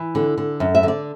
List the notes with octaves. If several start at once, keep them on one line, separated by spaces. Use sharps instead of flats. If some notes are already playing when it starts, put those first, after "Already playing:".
Already playing: E3
D3
D3
F#2
E5
D3 D5